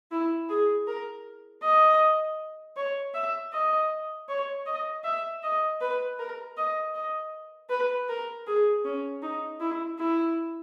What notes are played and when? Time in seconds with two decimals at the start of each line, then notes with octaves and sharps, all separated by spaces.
0.11 E4
0.49 G#4
0.87 A#4
1.62 D#5
2.77 C#5
3.15 E5
3.53 D#5
4.29 C#5
4.66 D#5
5.04 E5
5.43 D#5
5.81 B4
6.19 A#4
6.57 D#5
6.94 D#5
7.70 B4
8.09 A#4
8.47 G#4
8.85 C#4
9.22 D#4
9.60 E4
9.99 E4